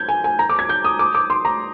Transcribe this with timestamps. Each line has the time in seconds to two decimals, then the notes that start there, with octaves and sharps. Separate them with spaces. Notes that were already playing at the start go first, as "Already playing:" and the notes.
Already playing: G6 G#6
0.09 G#5
0.24 G#5
0.39 A#5
0.50 D6
0.59 G#6
0.69 G6
0.84 D#6
0.99 D6
1.15 D6
1.30 C6
1.45 A#5